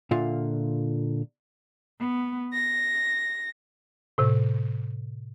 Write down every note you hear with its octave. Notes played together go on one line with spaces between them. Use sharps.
A#2 D3 F4 E5 F5
B3
A#6
A2 C3